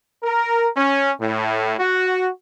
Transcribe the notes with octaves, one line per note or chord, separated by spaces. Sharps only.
A#4
C#4
A2
F#4